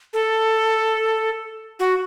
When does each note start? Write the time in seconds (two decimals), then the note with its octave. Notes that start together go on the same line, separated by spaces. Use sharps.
0.13 A4
1.79 F#4